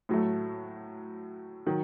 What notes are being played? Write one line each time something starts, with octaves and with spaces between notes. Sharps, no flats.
A2 F#3 A3
D#3 F#3